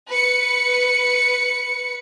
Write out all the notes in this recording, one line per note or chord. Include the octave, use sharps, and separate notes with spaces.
B4 C#7